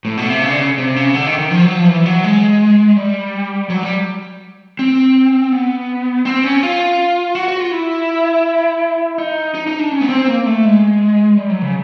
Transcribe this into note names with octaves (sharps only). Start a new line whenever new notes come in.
A2
B2
C3
C#3
D3
C#3
C3
C#3
D3
D#3
D#3
F3
F#3
F3
E3
F#3
G#3
G3
F#3
G3
C4
B3
C4
C#4
F4
F#4
F#4
F4
E4
D#4
D#4
D#4
D4
C#4
B3
C4
A#3
A3
G#3
G3
F#3
C#3